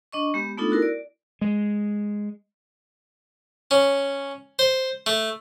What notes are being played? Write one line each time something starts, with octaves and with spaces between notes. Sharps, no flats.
D4 D#5 C#6
G#3 B3 G4
A3 B3 D4 D#4 F4 A4
E4 F#4 A#4
D5
G#3
C#4
C5
A3